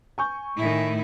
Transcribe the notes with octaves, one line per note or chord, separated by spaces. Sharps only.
G#5 C#6 G6
A2 D#3 E4